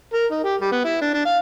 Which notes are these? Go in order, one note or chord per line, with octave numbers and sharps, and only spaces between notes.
A#4
D#4
G4
G3
B3
E4
D4
D4
F5